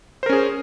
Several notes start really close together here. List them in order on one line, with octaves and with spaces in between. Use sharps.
C5 A#4 C#4 G#4